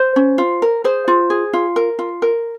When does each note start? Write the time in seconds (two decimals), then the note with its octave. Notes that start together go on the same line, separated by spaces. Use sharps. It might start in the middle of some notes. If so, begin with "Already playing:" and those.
Already playing: C5
0.16 C#4
0.38 F4
0.62 A#4
0.84 G#4 C5
1.08 F4
1.30 G#4
1.53 F4
1.76 A#4
1.99 F4
2.22 A#4